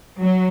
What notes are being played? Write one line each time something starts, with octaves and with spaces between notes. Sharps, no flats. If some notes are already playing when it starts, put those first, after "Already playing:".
F#3